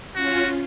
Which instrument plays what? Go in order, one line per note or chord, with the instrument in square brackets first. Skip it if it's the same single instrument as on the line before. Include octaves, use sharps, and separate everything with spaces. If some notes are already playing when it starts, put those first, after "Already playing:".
[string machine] C#4 F4 [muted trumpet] F#4